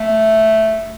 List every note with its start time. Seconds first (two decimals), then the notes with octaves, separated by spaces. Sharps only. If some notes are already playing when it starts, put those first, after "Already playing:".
Already playing: A3